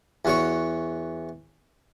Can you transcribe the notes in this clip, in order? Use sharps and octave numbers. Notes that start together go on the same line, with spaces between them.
E2 F#4 C#5